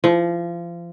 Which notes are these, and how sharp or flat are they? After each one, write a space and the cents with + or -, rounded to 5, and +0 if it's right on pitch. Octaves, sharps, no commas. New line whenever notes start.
F3 -30